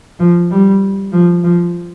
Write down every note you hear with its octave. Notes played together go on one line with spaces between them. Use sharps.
F3
G3
F3
F3